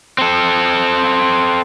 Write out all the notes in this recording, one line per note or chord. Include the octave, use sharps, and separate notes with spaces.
C4 A4